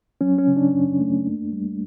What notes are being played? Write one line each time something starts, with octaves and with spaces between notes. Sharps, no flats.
F#3 C#4
C#4
C#3
D4
F#2
A3
A#3
G3